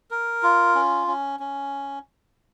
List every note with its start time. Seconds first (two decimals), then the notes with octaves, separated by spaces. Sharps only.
0.11 A#4
0.43 F4
0.75 C#4
1.07 C#4
1.40 C#4